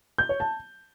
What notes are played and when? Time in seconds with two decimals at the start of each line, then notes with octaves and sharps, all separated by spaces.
0.18 G6
0.29 C#5
0.40 A5